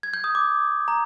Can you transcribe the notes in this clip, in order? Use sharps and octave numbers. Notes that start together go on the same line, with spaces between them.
G#6
G6
D#6
D6
A#5